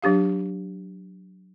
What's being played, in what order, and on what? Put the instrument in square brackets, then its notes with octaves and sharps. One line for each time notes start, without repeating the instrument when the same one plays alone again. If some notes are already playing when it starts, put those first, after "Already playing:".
[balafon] F#3 D4 G4 F5